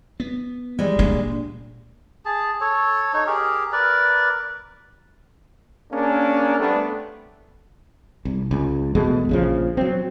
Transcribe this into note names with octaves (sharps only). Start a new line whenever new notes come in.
B3
E3 F3 G3 G#3
A#2 D4
G#4 A5
A4 C#5
D#4 C#5
G4 G#4 A#4
A#4 B4 D5
A#3 C#4 D4 G#4 A#4
G3 A3 B3 C4 D4
C2
C#2
E2 B2 G#3 A3
A#1 C#3 F3
F#3 C4